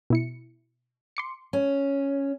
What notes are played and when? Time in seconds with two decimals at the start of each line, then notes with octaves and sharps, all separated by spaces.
0.10 B2 E4 C#7
1.17 C6 D6 C#7
1.53 C#4